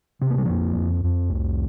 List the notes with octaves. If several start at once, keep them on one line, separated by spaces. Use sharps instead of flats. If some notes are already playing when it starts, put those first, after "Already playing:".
C3 C4
A#3
G3
F2 F3 A#3
F2
F2
C2